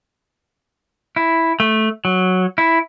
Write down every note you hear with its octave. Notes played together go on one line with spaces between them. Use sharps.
E4
A3
F#3
E4